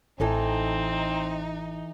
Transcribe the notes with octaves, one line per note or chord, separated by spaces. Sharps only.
A1 E3 C4 D#4 A4 A5